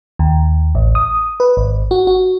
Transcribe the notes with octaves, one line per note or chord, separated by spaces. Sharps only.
D#2
A1
D#6
B4
G#1
F#4
F#4